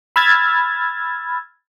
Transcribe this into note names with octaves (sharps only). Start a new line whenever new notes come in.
B5 E6 F6 G#6 A6